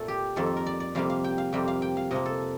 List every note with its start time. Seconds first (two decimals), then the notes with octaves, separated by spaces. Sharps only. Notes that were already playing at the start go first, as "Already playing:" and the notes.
Already playing: A#2 A3 C4 A4
0.08 G4
0.36 F2 D#3 A#3 A4
0.46 A4
0.57 A#4
0.66 D5
0.80 D5
0.95 F2 C3 G3 A#3 F5
1.10 F5
1.24 G5
1.38 F5
1.53 F2 C3 G3 A#3 G5
1.68 F5
1.82 G5
1.97 F5
2.11 C3 F3 A#3 D#5
2.26 A4